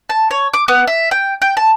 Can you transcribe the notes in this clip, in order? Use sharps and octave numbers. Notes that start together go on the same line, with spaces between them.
A5
C#5
D6
B3
E5
G5
G5
A5